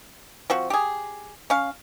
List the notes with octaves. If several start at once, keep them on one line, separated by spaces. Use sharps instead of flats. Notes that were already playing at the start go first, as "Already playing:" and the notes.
F3 C4 F#4
G4 G#4
C#4 F5